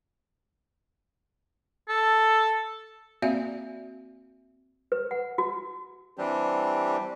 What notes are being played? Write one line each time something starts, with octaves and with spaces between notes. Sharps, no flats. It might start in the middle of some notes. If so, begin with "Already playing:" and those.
A4
A#3 C4 F#4 D5 E5 F5
B4
F#5
F#4
E3 G3 C4 D4 G4